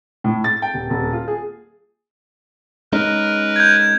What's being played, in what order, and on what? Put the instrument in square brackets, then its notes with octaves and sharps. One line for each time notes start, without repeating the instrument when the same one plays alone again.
[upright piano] A2
A6
G5
D#1
D#1
F4
G#4
[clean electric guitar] G#3 C#4 D#4 [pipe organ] A#4 B4
[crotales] G6 G#6